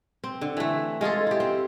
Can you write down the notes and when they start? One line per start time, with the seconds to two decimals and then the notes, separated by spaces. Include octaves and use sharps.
0.24 C4
0.41 D3
0.57 E3 A3
1.01 G#3 F4 G#4 A4
1.27 E4 G4
1.40 C4